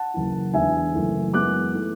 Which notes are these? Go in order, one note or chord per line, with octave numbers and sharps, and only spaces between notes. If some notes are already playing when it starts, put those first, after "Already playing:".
Already playing: F#5 A5
F#1 F#2 E3
E1 E2 D3 E5 G#5
F#1 F#2 E3 A3
F#2 E3 G#3 B3 D6 F#6
E3 A3